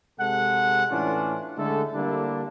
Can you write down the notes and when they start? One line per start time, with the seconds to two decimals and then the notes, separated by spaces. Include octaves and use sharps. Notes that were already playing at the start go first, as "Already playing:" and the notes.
0.20 C3 G#3 A4 F#5
0.91 A2 E3 C#4 D4 F4
1.58 D3 G#3 A3 A4
1.95 D3 G3 A#3 D4 E4